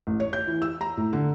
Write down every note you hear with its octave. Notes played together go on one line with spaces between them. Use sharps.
A1
C#5
G6
E3
E6
A#5
A2
D3